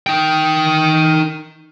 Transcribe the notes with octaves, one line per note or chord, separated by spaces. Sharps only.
D#4 G5